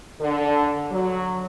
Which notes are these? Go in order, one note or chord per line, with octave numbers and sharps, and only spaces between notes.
D3
F#3